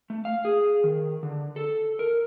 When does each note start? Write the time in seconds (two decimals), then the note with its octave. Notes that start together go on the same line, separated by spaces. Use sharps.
0.10 A3
0.25 F5
0.45 G#4
0.84 D#3
1.23 D3
1.56 A4
1.99 A#4